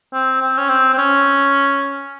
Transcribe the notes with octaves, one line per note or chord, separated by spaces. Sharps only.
C4
C4
C#4
C4
C4
C#4